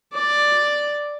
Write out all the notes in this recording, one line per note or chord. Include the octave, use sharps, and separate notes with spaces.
D5